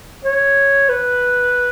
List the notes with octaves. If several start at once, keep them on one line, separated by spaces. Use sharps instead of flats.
C#5
B4